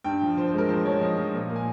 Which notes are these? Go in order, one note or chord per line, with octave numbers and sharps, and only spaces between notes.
G2 G5
F3
F3 C5
C5
G#3 A#4
F3 C5
F3 C#5
F3 D#5
F3
A#2
A#3
G#5